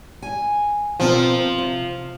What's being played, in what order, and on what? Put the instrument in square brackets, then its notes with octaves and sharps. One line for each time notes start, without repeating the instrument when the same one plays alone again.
[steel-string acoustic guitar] G#5
[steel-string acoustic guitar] B2 C4 A#4 [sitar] F3
[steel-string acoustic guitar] C3